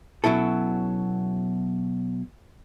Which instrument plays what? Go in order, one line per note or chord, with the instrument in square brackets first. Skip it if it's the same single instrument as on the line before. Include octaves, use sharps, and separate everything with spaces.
[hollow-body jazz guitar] B2 F#3 C#4 E4 A4